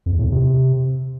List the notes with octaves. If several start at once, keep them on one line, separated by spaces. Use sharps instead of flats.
F2
E2
A2
E2
C3